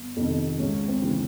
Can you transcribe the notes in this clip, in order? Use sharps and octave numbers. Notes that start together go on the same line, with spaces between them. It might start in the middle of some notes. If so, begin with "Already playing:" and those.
Already playing: G1
F2 C3 D#3
C#2 C#4
C4
C#3 E3